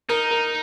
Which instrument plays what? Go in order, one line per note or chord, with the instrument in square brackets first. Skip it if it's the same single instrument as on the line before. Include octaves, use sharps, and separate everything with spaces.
[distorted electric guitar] D#4 [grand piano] A#4
[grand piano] A#4